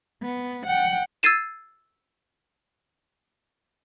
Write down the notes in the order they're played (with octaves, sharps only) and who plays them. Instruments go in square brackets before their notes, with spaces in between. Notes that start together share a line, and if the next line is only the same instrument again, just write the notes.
[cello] B3
F#5 G5
[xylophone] E6 G#6 A6 C7 D#7 E7